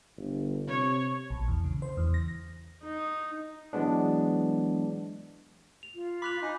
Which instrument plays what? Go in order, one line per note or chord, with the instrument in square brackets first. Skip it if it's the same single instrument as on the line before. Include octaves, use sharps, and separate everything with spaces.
[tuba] G1
[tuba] C3 [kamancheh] C#5
[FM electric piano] A#1
E2
C#3
C5
E2
A#6
[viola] D#4
[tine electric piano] E3 F#3 G#3 B3 D4
[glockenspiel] F7
[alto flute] F4
[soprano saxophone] B5 [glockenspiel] D6 F#6 F7
[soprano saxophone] D#4 [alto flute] G#5